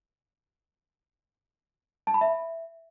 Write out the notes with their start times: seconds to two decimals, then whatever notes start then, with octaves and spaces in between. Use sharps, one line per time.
2.07 A5
2.14 B5
2.21 E5